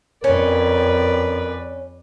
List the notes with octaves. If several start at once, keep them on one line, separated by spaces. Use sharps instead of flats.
F2 C#4 A#4 B4 D5